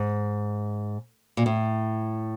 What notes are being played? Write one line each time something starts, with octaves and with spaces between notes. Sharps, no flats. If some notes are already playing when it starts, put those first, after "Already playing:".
Already playing: G#2
A#2
A2